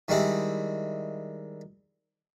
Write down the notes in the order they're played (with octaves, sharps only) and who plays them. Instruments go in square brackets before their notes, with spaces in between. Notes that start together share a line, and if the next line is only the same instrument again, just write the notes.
[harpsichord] D#3 G3 G#3 C4 E4